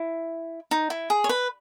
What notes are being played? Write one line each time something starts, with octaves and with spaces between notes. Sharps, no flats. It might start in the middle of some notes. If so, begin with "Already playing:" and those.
Already playing: E4
D#4
E4
G#4
C#5
B4